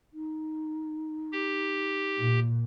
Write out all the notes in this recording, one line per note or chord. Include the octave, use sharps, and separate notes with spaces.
D#4
G4
A#2